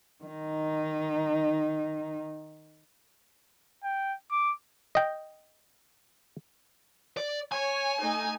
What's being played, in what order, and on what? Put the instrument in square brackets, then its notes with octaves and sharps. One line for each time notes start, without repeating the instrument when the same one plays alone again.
[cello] D#3 D#4
[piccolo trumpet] G5
D6
[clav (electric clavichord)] D#5 G5
[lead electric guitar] D5
[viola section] C#5 [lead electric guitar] G#5
[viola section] A3 D#4